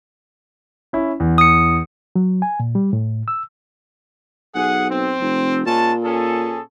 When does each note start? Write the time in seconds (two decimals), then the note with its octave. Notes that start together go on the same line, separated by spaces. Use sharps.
0.93 C#4 E4
1.20 E2
1.38 D#6 C#7
2.16 F#3
2.42 G#5
2.60 A#2
2.75 G3
2.93 A2
3.28 E6
4.55 B1 G#4 F#5
4.89 C4
5.21 F1
5.66 A#2 G#3 C#4 A5
6.03 C#4 G#4 A4